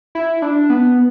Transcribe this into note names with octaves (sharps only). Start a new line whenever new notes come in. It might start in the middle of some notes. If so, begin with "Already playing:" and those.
E4
D4
B3